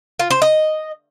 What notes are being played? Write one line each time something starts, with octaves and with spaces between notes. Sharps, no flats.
F4
C5
D#5